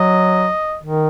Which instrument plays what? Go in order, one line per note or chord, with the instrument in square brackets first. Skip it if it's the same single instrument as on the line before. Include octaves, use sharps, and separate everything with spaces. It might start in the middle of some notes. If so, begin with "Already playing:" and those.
Already playing: [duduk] F#3 [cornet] D#5
[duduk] D#3